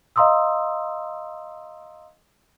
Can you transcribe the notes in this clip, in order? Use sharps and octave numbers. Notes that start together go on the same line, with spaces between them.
D#5 F5 A#5 C6 D#6 E6